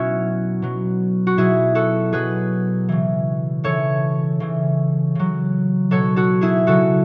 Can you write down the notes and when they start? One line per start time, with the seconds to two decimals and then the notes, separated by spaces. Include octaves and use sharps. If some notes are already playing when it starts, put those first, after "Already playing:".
Already playing: B2 F#3 C#4 E4 F#4
0.62 B2 F#3
1.27 F#4
1.37 B2 F#3 E4 G#4
1.75 F#4 A4
2.13 B2 F#3 G#4 B4
2.89 C#3 E3
3.64 C#3 E3 A4 C#5
4.40 C#3 E3
5.15 C#3 F#3
5.91 B2 F#3 A4 C#5
6.16 F#4 A4
6.41 E4 G#4
6.67 C#3 F#3 F#4 A4